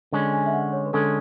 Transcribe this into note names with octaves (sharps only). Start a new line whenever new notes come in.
D3 G#3 C#4 G#5
G#5
E5
F#5
C#5
B4
D3 G#3 C#4 A4